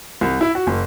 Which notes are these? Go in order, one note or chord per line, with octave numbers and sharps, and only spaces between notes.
C2
E4
F#4
F#1